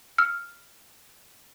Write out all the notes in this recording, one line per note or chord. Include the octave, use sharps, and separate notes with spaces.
E6 F6 C#7